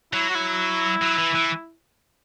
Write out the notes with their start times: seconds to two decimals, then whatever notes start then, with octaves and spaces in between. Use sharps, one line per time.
0.13 F#3 E4
0.29 F#4
0.35 E4
1.01 F#3
1.18 E3
1.35 E3